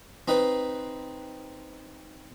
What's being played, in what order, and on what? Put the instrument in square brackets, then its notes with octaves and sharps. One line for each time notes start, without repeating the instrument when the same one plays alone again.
[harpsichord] C4 D#4 B4